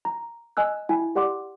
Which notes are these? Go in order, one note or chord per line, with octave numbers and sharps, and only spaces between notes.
A#5
D#5 G#5 E6 F#6
E4 G5 G#5
G4 D5 F#5 C6 D6